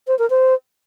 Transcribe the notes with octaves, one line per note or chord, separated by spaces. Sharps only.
C5
A#4
C5